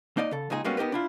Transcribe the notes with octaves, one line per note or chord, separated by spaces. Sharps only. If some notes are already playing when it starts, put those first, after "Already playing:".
A#3 D#4 D5 D#5
C#3 A4
C#2 A#2 D#4 G#4
G3 G#3 A#3 B3 C#4 F#4
B3 D#4 G4 A#4 B4
D4 E4 F4